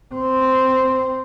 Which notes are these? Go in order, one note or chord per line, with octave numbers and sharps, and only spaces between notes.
C4